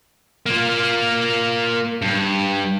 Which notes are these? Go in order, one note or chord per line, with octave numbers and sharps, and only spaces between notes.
A#3 F4
G2